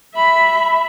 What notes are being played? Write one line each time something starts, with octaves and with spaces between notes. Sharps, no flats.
E5 B5